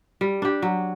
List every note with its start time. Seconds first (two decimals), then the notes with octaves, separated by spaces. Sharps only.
0.21 G3
0.42 D4 G4
0.62 F#3